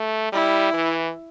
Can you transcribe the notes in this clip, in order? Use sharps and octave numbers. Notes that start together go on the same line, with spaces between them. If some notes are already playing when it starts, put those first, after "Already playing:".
Already playing: A3
G3 E4
E3